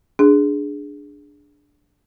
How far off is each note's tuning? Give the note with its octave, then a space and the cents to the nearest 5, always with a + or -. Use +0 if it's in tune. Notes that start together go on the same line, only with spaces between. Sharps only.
D4 +0 G#4 +0